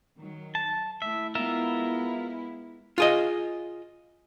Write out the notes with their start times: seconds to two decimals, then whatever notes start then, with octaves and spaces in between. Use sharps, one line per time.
0.17 D#3 F#3
0.55 A5
1.02 A3 E4 E5
1.35 G#3 B3 E4 F4 A#4 E5
2.98 F4 G#4 D#5